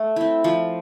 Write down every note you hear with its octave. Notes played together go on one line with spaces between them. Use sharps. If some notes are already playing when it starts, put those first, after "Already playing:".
Already playing: A3
C4 E4
F3